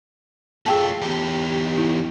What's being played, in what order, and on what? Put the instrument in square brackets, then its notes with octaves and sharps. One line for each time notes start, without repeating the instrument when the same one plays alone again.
[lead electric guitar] A3 F4 [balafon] G#4 G5 A5
[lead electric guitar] E2 G4
[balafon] E4